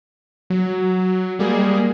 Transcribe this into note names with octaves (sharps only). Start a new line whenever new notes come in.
F#3
G3 G#3 A#3 G#4